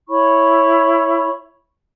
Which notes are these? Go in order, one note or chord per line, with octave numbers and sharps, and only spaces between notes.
E4 C#5 B5 C#6